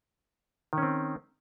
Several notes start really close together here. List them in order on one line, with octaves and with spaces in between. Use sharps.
D#3 C#4 C4